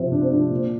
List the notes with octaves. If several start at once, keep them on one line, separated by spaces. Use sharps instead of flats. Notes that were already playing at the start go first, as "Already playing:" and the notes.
Already playing: C3 F3 C4
C3 D4
C4
F3 D4
A#2